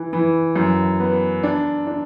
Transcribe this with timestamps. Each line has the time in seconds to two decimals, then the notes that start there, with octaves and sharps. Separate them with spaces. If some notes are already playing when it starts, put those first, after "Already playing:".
Already playing: E3
0.13 E3
0.56 F#2
1.00 B3
1.43 D4
1.87 D4